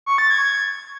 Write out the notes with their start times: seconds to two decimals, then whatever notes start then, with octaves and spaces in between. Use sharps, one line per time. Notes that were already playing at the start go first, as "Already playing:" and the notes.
0.06 C#6
0.18 A6
0.30 G#6